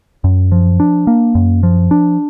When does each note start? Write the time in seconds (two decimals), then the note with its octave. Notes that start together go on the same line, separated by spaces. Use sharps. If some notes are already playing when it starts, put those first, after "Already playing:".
0.24 F#2
0.52 F3
0.80 D4
1.07 A#3
1.35 F#2
1.63 F3
1.91 D4